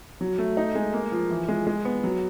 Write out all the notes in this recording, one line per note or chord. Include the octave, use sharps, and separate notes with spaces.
F#3
A3
D#4
G#3
A#3
F3
E3
G#3
G#3
B3
F#3